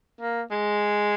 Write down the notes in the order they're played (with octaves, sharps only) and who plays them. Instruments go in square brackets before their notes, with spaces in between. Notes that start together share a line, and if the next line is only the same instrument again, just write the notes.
[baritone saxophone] A#3
G#3